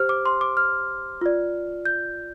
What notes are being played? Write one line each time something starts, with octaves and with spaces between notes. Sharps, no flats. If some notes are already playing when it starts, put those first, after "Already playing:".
Already playing: G4 C5 F6
D6
C6
D6
F6
F4 D5
G6